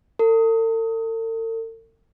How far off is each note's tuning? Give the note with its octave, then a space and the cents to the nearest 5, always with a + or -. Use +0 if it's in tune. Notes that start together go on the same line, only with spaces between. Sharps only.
A4 +45